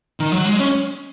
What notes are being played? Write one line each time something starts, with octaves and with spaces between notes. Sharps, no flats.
D#3
F#3
G#3
C#4